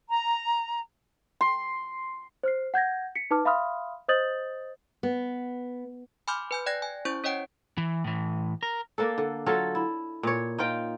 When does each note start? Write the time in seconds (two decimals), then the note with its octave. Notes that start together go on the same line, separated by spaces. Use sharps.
0.09 A#5
1.41 C6
2.43 C5 F6 C7
2.74 F#5 G6 G#6 A#6
3.15 B6 C#7
3.31 D#4 B4 A5 D6 F6
3.45 E5 F5 B5 C6 D#6 F6
4.08 C5 D#5 D#6 G6 A6 F#7
5.03 B3
6.28 G#5 B5 C6 D6 F6 G6
6.51 B4 G#5 G6
6.66 D5 G5 F#6 G#6 A#6
6.82 G#5
7.05 C#4 E4 C5 C#6 G6
7.24 C#4 C#5 D#5 F#5 G5 D7
7.78 E3
8.04 A2 E3
8.63 A#4
8.98 A#3 D4 A4
9.18 D3
9.46 F#3 F4 A4
9.75 E4
10.23 A#2 C#5
10.58 D#4 F4 G5